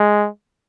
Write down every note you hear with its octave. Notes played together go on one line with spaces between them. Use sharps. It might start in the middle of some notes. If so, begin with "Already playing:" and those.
Already playing: G#3